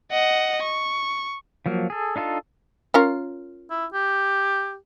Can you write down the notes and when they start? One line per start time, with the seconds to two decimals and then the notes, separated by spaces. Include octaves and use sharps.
0.11 D#5 F#5
0.62 C#6
1.66 F3 F#3 A#3
1.90 G#4 A4
2.16 D4 D#4 F4 A4
2.94 C#4 F4 A#4
3.70 E4
3.93 G4